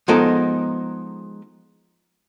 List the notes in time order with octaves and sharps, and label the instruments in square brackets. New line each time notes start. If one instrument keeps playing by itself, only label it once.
[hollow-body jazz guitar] F3 G#3 B3 D#4 A4 A#4